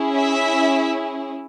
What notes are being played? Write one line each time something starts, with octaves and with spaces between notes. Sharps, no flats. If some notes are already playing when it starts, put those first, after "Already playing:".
Already playing: C#4 E4 G#4
E5